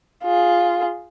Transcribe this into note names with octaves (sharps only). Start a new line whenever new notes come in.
F4 G#4